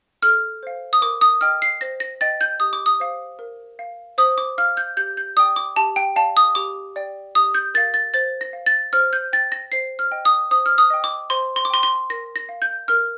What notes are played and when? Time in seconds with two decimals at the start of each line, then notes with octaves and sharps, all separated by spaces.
0.23 A4 F6
0.63 C5 F5
0.93 D#6
1.02 A#4 D6
1.21 D#6
1.41 D#5 G5 F6
1.62 C7
1.81 C5 A#6
2.00 A#6
2.21 D#5 G5 A6
2.41 G6
2.60 G4 D#6
2.73 D6
2.86 D#6
3.00 C5 F5
3.39 A#4
3.79 F5
4.18 C5 D#6
4.38 D6
4.58 F5 F6
4.77 G6
4.97 G4 G6
5.17 G6
5.37 D5 D#6
5.39 G5
5.56 D6
5.76 G4 A5
5.96 G5
6.16 D5 F5 A5
6.37 D#6
6.55 G4 D6
6.96 D5 G5
7.35 G4 D#6
7.55 G6
7.74 A#4 F5 A6
7.94 A6
8.14 C5 A6
8.41 A#6
8.53 F5
8.66 A6
8.93 C5 F6
9.13 G6
9.33 G5 A6
9.52 A#6
9.72 C5 C7
9.99 F6
10.12 D#5 G5
10.25 D#6
10.51 C5 D#6
10.66 F6
10.78 D#6
10.90 D#5 G5
11.04 D6
11.30 C5 C6
11.56 C6
11.65 D6
11.70 G5 C6
11.83 C6
12.10 A#4 A#6
12.36 A#6
12.49 F5
12.62 G6
12.88 A#4 F6